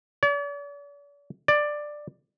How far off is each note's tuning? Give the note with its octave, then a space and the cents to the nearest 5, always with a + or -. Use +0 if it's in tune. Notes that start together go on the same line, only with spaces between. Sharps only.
D5 -45
D5 +10